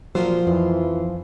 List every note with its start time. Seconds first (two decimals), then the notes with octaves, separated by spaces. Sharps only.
0.15 A#2 F3 F#3 F4 C5
0.47 F2 E3